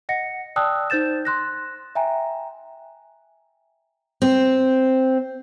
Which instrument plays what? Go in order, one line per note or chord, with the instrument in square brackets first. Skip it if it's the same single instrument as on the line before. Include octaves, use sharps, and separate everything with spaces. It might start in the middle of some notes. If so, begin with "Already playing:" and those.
[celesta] D#5 F#5 A#6 C#7
D5 G5 A5 D#6 E6 F#6
D#4 C5 G6 A6 E7
C6 F#6 A#6
E5 G5 G#5 A#5
[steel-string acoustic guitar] C4